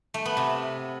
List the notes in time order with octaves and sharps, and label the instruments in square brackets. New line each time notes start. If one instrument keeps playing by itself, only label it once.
[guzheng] A3
B3
C3